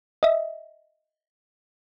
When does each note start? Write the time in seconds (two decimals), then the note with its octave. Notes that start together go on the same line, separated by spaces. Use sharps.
0.23 D#5 E5